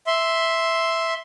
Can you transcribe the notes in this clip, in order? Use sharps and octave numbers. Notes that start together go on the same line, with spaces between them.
E5 C6